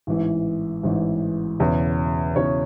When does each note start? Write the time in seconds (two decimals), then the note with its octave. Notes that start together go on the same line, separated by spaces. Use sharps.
0.07 A1 G#2 E3
0.83 A1 G#2 E3
1.59 E1 E2 C#3
2.35 E1 E2 C#3 C#5